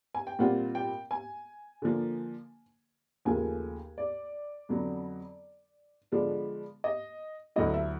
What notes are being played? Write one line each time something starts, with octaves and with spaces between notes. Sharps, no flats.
G#5
G5
A#2 G3 C4 F4 F#5
G5
G#5
D3 F3 A#3
D#2 C#3 F3 A3 G#5
D5
F2 D3 F#3 B3
D3 F3 G#3 B3 D4
D#5
D2 D3 F#3 B3 E4 D#5
E5